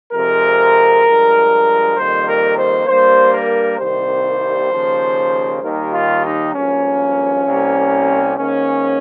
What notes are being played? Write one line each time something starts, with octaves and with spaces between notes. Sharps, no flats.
F2 C3 F3 G#3 A#4
G2 F3 G#3
F2 D#3 G3 A#3 C5
A#4
C5
G2 G3 A#3 C5
A#4
C2 C3 D#3 G3 A#3 C5
D#2 C#3 F3 A#3
D#2 D#3 G3 A#4
F4
D#4
G#1 G2 F3 A#3 C#4
C2 C3 G3 A#3
G#2 D#3 A#3 C#4